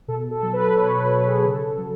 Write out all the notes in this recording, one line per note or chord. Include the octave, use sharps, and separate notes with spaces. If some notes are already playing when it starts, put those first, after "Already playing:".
B2 A4
A4
F#3
B4
B2 C#5
B4
F#3 A4
G#4
C#3 A4
F#3